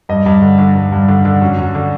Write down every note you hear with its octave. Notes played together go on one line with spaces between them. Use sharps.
G2 D#5
G2
D3
D3
G2
G2
D3
D3
F#2
F#2
D3